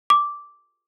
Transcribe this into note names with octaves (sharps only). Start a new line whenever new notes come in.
D6